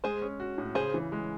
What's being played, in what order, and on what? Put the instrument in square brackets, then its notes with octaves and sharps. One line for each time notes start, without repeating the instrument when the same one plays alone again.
[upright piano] G#3 [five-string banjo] G#4 C5
[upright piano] C#4
F#4
A2
[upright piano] C#3 [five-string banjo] G#4 C5
[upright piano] E3
G#3